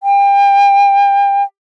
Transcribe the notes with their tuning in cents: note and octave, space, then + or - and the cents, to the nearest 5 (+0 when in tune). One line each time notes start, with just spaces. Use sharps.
G5 +35